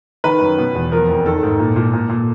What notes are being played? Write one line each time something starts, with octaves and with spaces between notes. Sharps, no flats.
D#3 B4
F#2
B2
E2
F3 A#4
F2
D#3 A4
G#2
A#2
A#2
A#2
A#2